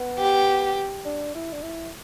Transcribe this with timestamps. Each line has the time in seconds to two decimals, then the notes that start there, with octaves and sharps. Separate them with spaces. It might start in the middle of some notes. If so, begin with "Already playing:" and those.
Already playing: B3
0.19 G4
1.05 D4
1.35 E4
1.52 D4
1.63 E4